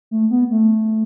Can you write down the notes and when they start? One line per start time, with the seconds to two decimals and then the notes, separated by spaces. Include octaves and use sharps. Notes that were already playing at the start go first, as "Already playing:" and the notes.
0.11 A3
0.31 B3
0.51 A3